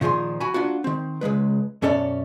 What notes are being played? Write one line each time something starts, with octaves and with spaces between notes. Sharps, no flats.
A#2 D#3 F3 G#4 C6
F#4 G#5 B5
A#3 D4 F4 F#4
D#3 C4
C#2 A#2 G#3 B4
F#2 B2 C#4 A4 C#5 D5